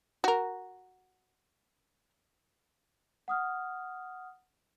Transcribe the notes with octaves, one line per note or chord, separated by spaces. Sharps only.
F#4 A#4
F#5 D#6 F6